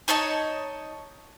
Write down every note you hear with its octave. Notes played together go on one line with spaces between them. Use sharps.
D#4 C#5 D#5 A5